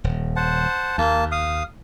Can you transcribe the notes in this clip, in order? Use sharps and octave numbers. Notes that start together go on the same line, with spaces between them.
D#1
C5 F#5 A5
D#2 A#3 A5
F5 D#6